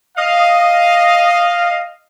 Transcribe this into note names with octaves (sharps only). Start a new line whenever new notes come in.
D#5 F5